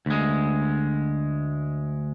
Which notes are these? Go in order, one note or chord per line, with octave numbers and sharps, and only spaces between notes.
D2 G#3